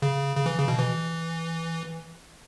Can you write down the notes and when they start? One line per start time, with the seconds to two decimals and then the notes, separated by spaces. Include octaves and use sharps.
0.02 C#3
0.37 C#3
0.46 E3
0.59 C#3
0.68 B2
0.79 E3